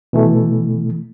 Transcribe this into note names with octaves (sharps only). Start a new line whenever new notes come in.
B2 E3 A3